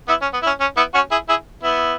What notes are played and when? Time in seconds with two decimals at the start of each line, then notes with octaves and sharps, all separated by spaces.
0.08 B3 E4
0.22 C#4
0.33 B3
0.42 E4
0.47 C#4
0.60 C#4
0.77 B3 E4
0.94 C#4 F#4
1.11 E4 G#4
1.29 E4 G#4
1.63 B3 E4